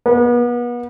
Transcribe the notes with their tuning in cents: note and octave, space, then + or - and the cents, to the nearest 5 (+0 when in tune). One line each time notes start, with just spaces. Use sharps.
B3 -35